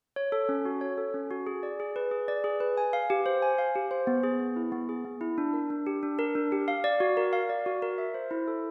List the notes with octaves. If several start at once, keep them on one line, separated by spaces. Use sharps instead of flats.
C#5
A4
C#4
F#4
C#5
A4
C#4
F#4
G#4
D5
G#4
B4
G#4
D5
G#4
B4
G#5
F5
G4
C5
G#5
F5
G4
C5
B3
G#4
B3
E4
B3
G#4
B3
E4
D4
A#4
D4
G4
D4
A#4
D4
G4
F5
D5
F#4
A#4
F5
D5
F#4
A#4
E5
C5
E4
A4